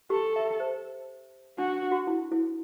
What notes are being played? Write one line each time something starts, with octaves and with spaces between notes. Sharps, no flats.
G4 A4
E5
C5
D4 F#4
F#4
E4
E4